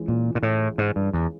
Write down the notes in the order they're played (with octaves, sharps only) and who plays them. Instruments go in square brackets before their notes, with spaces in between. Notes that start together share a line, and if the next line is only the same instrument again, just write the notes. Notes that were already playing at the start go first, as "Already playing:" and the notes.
Already playing: [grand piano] C#2 C#3 E3 G#3
[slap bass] A#2
A#2
A2
G#2
G2
E2